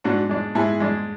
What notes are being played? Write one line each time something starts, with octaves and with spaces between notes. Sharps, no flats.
G#2 D4 F#4
G#3 D4
G#2 E4 G#4
G#3 D4